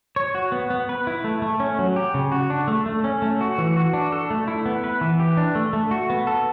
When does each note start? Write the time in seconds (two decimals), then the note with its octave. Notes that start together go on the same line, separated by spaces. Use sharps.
0.16 C#5
0.35 F#4
0.52 B3
0.70 B3
0.89 B4
1.07 E4
1.24 A3
1.42 A3
1.60 C#4
1.79 F#3
1.96 G4
2.14 C#3
2.32 F#4
2.50 D4
2.68 A3
2.86 A3
3.04 C#4
3.22 A3
3.41 F#4
3.58 E3
3.77 F#4
3.93 D4
4.12 A4
4.30 A3
4.48 E4
4.66 B3
4.84 B4
5.01 E3
5.20 G4
5.37 D4
5.55 A3
5.73 A3
5.91 F#4
6.10 B3
6.27 A4